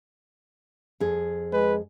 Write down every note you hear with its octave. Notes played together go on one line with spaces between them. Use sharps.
F2 G#4
G#3 B4